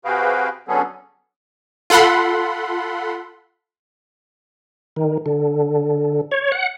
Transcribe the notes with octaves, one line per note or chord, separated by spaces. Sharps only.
C3 F#4 G#4 B4 F5 G5
D3 F#3 B3 C#4 G#4 A4
F4 A4 F#5 B5 C6
D#3
D3
C#5
F#5